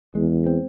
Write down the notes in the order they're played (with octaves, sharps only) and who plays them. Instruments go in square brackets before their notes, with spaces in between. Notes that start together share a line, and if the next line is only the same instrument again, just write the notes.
[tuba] E2 [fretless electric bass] G#3
[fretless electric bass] C4